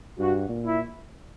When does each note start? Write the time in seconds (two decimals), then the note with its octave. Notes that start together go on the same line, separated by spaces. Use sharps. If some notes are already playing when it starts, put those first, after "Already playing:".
0.19 G2 F#4
0.49 A#2
0.66 E4